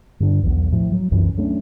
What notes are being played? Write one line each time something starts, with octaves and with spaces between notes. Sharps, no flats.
G2 D3 D4
B1 E2
A2 F3
F#3
C2 F#2 E3
F#3 A3 C#4 D4